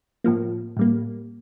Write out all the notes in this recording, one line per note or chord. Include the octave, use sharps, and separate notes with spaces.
A2 F3 A#3
A2 G3 A#3